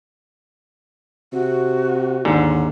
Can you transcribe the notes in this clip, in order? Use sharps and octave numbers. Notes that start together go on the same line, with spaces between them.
C3 F#4
D#2 G#2 D3